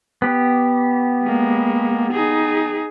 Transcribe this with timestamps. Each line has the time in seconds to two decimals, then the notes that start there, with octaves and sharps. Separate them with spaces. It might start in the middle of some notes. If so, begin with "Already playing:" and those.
0.22 B3 G4
1.23 G#3 A#3
2.13 D#4 G#4